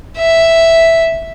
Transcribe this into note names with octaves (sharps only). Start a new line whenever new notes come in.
E5